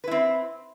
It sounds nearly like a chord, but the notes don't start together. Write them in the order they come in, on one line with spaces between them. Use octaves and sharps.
B4 E4 C4